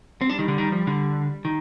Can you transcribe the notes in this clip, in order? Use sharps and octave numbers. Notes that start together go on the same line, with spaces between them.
C4
G3 D4
D#3
D3
D#3
F3
D3
D#3